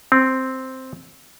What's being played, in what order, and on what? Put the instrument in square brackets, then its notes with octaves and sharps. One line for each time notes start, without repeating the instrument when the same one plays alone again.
[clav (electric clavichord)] C4